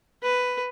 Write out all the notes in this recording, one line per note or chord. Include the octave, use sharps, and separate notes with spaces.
B4